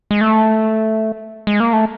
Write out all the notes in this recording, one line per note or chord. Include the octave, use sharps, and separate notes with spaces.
G#3
A3
G#3
A#3
A3